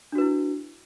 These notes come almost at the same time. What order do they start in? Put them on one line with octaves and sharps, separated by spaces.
D4 F#4 B4 E4